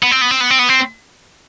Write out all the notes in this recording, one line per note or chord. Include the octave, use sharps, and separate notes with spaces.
B3
C4
B3
C4
B3
C4
B3
C4